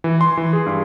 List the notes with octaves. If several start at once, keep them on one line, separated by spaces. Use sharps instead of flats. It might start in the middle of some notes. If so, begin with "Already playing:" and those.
E3
C6
E3
G#4
G2